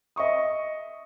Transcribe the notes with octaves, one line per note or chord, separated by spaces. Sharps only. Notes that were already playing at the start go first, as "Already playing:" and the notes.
D#5 E5 C#6 D#6